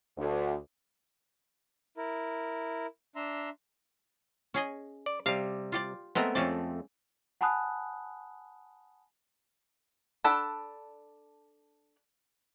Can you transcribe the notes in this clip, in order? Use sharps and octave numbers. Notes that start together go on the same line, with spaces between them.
D2
E4 A#4
D4 E5 A#5 C6
C#4 G#4 D#5
D5
C3 G3 F5
F4 G4 D5
G#3 A3 B3 C4 A#4
F2 A3 C4 C#4 C5 D5
F#5 G#5 A5 B5 D#6 F#6
D4 A4 F#5 A5 B5